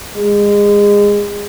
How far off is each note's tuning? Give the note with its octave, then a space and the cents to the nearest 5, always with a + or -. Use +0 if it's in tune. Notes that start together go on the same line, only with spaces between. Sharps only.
G#3 -25